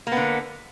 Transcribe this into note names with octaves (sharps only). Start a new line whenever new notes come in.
D3 A#3 B3